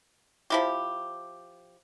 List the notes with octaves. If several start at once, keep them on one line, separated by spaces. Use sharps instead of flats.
F3 E4 G4